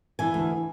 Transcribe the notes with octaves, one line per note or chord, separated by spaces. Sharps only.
E3 G#5
D2